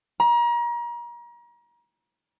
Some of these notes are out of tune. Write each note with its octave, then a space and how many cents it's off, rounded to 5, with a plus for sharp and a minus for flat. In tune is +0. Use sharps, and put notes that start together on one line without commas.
A#5 +35